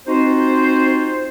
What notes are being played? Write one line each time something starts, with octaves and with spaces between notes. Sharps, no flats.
C4 D#4 F4 F#4 C5